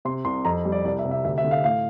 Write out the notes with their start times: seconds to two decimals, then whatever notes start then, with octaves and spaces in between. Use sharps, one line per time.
0.05 C3 C6
0.25 C2 C6
0.45 F2 A#5
0.65 G3
0.72 D5
0.85 C2 D5
0.99 E5
1.05 C3
1.11 E5
1.25 D2 E5
1.38 E5
1.44 D3
1.51 F5
1.64 A2 F5